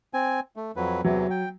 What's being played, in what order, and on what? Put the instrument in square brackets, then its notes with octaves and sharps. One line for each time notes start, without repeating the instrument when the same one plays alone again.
[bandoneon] C4 G#5
A3
F2 F#3 B4
[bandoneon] E2 C3 E3 [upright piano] F#3
[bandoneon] G5